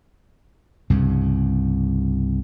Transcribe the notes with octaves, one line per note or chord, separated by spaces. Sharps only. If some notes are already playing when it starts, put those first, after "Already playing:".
C2 G2 C#3